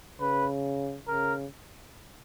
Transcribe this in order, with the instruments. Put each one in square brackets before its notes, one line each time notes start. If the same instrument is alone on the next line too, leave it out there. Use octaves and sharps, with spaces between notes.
[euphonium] C#3 [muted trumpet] B4
[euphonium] C#3 [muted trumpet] A#4